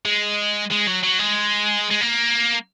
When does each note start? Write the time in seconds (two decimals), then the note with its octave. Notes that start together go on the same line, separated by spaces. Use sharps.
0.05 G#3
0.72 G#3
0.88 F#3
1.03 F#3
1.19 G#3
1.91 G#3
2.01 A#3